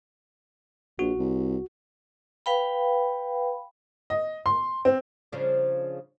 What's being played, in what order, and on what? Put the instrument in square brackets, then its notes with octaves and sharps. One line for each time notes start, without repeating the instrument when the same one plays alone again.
[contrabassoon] A#1 [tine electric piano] F#4
[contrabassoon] C2
[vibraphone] B4 F5 G5 B5
[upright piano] D#5
C6
C4
[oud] C#3 F3 D4